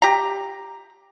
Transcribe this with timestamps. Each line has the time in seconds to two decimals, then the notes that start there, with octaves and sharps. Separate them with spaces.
0.02 G4 A#5